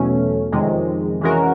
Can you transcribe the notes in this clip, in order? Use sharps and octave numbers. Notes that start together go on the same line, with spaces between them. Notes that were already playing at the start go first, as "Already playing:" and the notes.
Already playing: E2 B2 F#3 A3 C#4
F2 C3 D#3 G#3
E3 G#3 C#4 F#4 A#4